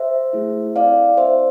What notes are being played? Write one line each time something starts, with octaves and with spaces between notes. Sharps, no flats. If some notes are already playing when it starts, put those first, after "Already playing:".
Already playing: C5 E5
A3 E4 G#4
C4 E4 A4 D5 F5
C4 E4 A4 C5 E5